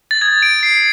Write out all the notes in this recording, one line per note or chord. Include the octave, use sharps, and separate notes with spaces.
A6
D#6 G6 G#6
D7
C7